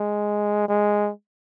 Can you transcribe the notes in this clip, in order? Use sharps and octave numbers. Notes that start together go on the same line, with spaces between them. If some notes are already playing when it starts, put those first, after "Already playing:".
Already playing: G#3
G#3